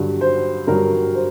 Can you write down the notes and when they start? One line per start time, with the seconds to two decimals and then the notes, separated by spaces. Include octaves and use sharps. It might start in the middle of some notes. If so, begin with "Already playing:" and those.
Already playing: G2 D3 F#3
0.21 C5
0.67 G2 D3 F#3 A#4
1.14 C5